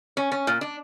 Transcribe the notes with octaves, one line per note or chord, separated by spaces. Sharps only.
C#4
C#4
A#2
D4